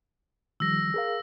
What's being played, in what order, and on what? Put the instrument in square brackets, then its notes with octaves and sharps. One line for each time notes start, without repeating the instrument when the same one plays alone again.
[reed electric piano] D#3 F3 G3 [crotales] E6 A#6
[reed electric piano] G#4 A#4 F5